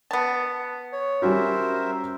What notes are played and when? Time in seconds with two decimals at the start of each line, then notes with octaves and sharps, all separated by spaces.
0.11 B3 A5
0.92 C#5
1.22 G3 C#4 F#4 A#4 C5 E5